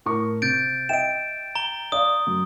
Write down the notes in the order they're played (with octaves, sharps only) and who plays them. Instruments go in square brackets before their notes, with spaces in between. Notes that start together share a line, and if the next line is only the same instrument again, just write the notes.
[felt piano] A2 A#4 C#6
[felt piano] C3 [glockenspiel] G6 A6 D7
[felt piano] D#5 E5 G5 [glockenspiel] D7 E7
[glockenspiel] A#5 G7
[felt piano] D5 F5 [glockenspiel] D#6
[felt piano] F#2